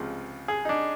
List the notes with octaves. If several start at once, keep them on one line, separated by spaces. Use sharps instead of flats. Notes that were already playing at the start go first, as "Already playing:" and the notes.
Already playing: C#2 C3 F3 G#3
G#4
D#4
D4